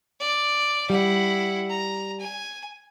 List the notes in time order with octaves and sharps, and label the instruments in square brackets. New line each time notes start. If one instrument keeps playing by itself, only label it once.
[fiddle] D5
[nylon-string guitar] G3 [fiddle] E4 F#5
[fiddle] A#5
G#5